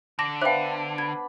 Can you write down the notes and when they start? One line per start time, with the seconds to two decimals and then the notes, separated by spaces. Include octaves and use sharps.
0.19 D3 A5 D6 A#6
0.42 B3 D4 C5 E5 F5 G5
0.98 B5 G#6